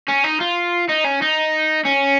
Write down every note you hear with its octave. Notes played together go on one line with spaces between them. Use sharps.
C#4
D#4
F4
D#4
C#4
D#4
C#4